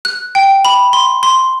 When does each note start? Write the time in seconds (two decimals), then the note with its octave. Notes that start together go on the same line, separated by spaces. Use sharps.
0.05 F#6
0.35 G5
0.65 B5
0.93 C6
1.23 C6